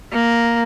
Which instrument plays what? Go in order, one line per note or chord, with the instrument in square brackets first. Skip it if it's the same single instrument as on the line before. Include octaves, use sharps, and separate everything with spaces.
[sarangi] A#3